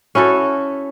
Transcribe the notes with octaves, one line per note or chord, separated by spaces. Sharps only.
C#4 E4 F#4 A4